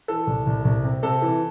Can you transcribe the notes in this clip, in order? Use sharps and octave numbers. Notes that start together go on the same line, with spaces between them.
E3 A4
C2
C2
C2
C3
C3 A4
E3